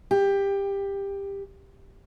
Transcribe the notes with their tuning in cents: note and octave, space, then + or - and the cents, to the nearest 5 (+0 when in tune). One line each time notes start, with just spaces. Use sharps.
G4 +15